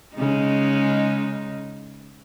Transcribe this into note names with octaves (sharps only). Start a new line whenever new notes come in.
C#3 G#3 D#4